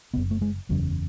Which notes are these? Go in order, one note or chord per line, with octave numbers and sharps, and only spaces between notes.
F#1 E2 C#3 B3
A3
G#3
F#1 E2 C#3 F#3